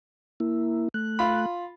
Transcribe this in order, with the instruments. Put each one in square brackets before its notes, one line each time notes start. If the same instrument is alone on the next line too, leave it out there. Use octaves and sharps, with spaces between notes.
[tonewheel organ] A#3 E4
A3 F#6
[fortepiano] F4 B5